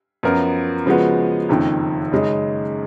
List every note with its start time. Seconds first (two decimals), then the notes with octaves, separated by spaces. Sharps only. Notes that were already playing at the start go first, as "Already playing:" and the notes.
0.23 F#2 F3 B3 F4 A#4
0.86 C#3 F3 G#3 B3 F#4
1.49 F#1 F2 D#3
2.11 F#2 C#3 G#3 D#4